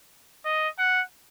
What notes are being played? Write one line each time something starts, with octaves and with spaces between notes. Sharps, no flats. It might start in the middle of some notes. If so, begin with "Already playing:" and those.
D#5
F#5